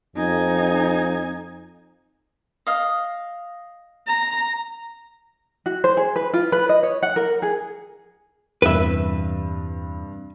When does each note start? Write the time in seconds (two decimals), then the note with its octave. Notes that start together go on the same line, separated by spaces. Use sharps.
0.16 F2 D#4 G#5
2.67 D#5 F5
4.07 A#5
5.66 F#4
5.84 C5
5.97 G#4
6.16 B4
6.33 F4
6.52 B4
6.69 D#5
6.83 C#5
7.03 F#5
7.16 A#4
7.42 G#4
8.62 E2 G2 C3 E3 B4 E5